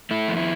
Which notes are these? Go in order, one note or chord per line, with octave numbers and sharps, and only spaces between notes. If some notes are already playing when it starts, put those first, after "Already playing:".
A3 E4
F2
E4